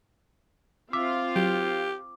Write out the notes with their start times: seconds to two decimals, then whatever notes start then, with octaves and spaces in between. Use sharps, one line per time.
0.93 C4 F4 E5 F5 D6
1.36 F#3 G4